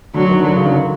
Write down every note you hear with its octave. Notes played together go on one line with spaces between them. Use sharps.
D3 F#3
D#3
D3 F#3
C#3
D#3
D3